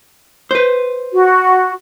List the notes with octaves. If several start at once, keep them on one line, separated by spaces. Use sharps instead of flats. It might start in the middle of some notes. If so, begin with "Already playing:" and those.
B4 C5
F#4